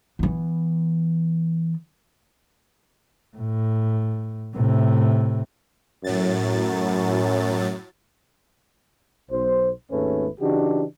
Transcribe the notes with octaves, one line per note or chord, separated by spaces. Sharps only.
E3 B3
A2
A2 C3
F#2 A2 F#3 A6
B1 C5
G#1 D#2 G#2 A3 C#4 B4
C#3 E3 D4 D#4 F#4 G4